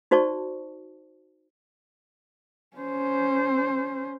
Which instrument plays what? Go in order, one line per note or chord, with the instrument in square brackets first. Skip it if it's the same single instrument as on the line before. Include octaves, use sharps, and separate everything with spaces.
[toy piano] D#4 F#4 C5 D5 A5 C#6
[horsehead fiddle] C#4 C5